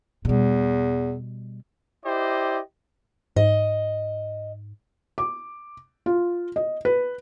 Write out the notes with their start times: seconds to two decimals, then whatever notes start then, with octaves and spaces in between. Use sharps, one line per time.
0.25 E2 B2 G3
2.05 E4 G4 C5 D5 D#5
3.36 G#2 D#5
5.18 D6
6.06 F4
6.56 D#5
6.85 B4